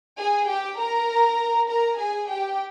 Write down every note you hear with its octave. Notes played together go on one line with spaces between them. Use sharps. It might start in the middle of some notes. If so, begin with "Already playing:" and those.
G#4 G#5
G4 G5
A#4 A#5
A#4 A#5
G#4 G#5
G4 G5